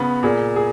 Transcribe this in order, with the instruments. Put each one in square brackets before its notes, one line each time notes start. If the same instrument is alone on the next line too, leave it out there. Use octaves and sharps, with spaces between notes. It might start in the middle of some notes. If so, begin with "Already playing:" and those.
Already playing: [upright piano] C#3 B3
[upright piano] A#2 [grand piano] G#4
[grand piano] G#4